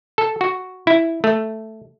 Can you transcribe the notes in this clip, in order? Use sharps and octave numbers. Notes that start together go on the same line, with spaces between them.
A4
F#4
E4
A3